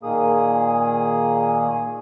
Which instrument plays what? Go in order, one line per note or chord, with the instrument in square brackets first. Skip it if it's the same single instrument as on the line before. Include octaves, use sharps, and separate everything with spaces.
[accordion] A#2 D#3 A#3 G#4 D#6